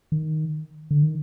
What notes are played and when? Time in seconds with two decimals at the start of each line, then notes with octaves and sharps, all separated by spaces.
0.12 D#3
0.91 D3
1.03 D#3